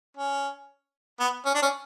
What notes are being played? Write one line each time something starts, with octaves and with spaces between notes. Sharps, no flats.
C#4
B3
C#4
D4
C#4